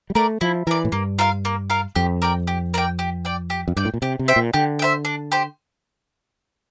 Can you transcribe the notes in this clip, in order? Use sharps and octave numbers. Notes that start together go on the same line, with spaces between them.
G3
A3 A#4 D5
F3 E4
E3 A#4 D5
A2
G2 A#3
F4 A#4 F5
A#3
F4 A#4 F5
F2 G4
A#4 D5 G5
G4
A#4 D5 G5
G4
D5 G5
G4
F2
G2 D5 G5
A2
A#2
C3 G4
C3
C5 E5 G5
A#2
D3 G4
G5
C5 E5
D4
G4 C5